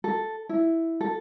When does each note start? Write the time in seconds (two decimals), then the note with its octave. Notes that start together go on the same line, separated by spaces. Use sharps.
0.04 A4
0.49 E4
1.01 A4